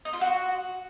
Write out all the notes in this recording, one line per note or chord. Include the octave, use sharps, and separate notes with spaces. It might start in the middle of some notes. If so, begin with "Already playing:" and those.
D#4
F4
F#4